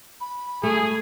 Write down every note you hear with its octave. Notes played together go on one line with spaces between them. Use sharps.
B5
A3 G#4